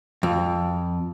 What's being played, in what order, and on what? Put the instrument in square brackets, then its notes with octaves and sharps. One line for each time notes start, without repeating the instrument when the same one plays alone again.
[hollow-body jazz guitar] F2